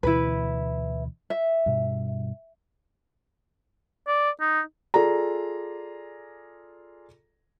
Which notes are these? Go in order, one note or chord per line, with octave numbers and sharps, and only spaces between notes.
D2 B2 E3 E4 B4
E5
G2 B2
D5
D#4
F4 G#4 A4 D5 A#5